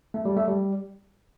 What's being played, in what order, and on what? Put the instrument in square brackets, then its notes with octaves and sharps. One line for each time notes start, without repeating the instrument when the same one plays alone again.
[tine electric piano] A3
G3
A3
G3